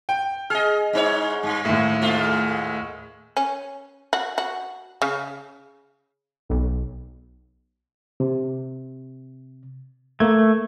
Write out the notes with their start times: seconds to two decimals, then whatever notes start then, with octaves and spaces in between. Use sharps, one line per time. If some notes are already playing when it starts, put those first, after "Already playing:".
0.09 G5
0.50 G#4 D#5 F6
0.93 G#2 D#4 C#5
1.43 G2
1.65 D#2 A2
2.01 G#2 A3 F4
3.37 C#4
4.13 F#4
4.38 F#4
5.02 C#3
6.49 B1
8.20 C3
10.20 A3 A#3 G#6